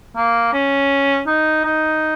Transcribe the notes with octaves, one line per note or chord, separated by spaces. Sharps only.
A#3
C#4
D#4
D#4